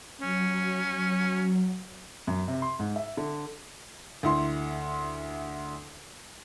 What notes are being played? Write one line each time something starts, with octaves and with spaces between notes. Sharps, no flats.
F#3 C#4
F#2
C3
C6
G#2
E5
D3
D2 E4 C6